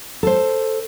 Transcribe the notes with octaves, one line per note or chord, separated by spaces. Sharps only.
A4 C5